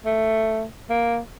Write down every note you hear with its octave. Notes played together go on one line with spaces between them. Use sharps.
A3
A#3